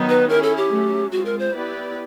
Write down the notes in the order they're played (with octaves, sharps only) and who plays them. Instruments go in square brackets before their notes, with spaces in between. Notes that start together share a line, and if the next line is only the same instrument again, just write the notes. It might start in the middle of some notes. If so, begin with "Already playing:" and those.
Already playing: [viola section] D#3 F#3 B3 D#4
[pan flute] B4
[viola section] C#4 E4 G#4 [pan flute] A#4
[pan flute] A4
G4
[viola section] F#3 A3 C#4
[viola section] G#3 C4 F4 [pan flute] F#4
[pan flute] A#4
C5
[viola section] B3 E4 G4 B4 D5